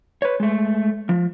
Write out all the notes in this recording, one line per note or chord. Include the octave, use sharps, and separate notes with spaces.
B4 C#5
G#3 A3
F3